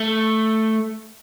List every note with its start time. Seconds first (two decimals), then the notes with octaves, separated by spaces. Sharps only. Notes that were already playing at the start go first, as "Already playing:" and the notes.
Already playing: A3